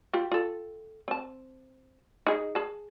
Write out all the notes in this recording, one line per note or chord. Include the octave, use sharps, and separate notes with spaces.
F4 G4
F4 A4
C4 A5
D#4 G#4 D#5
G#4 A5